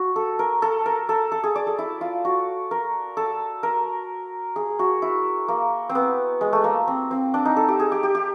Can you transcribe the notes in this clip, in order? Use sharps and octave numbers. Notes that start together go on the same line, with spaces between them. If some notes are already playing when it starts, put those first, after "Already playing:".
Already playing: F#4
A4
A#4
A4
A#4
A4
A4
G#4
D5
A4
E4
F4
F#4
A#4
A4
A#4
G#4
F#4
E4
A#3
C4
B3
G#3
A3
A#3
C4
C4
D4
D#4
A4
G4
G#4
G4
G4
G4